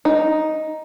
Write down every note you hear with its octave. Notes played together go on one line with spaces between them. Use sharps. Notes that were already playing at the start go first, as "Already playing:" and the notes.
D#4